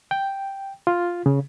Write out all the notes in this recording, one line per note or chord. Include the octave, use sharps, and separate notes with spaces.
G5
F4
C#3